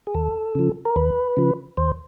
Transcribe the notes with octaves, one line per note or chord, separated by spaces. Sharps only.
G#4
D#2 A4
C#3 F3
A#4
D#2 B4
C#3 F3
D#2 C5